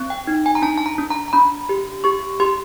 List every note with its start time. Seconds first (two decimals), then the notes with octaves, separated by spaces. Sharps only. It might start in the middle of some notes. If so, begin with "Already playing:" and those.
Already playing: C4
0.10 G5
0.27 D#4
0.46 G#5
0.55 A#5
0.62 D4 A5
0.78 A5
0.86 A#5
0.98 D4
1.10 A#5
1.28 A#5
1.33 D4 B5
1.69 G4
2.04 G4 C#6
2.40 G4 C6